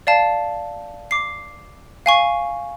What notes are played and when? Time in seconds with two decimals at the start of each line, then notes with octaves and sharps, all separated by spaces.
0.07 D5 F5 A5
1.11 D6 C7
2.06 F5 G#5 C#6